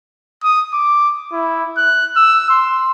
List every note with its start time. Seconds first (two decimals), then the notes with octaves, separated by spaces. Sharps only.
0.43 D#6
0.73 D6
1.32 E4
1.77 F#6
2.16 E6
2.49 C6